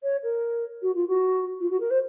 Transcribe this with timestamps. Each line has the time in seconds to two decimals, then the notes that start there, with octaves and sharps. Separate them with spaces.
0.03 C#5
0.23 A#4
0.82 F#4
0.95 F4
1.08 F#4
1.60 F4
1.70 F#4
1.80 A#4
1.90 C5